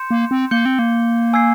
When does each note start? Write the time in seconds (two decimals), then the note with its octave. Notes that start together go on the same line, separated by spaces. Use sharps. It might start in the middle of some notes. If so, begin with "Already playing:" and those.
Already playing: C6 G6 C#7 E7
0.11 A#3
0.31 C4
0.51 A#3 G6 C#7 G7
0.65 C4
0.79 A#3
1.33 G#5 E6 G#6 C7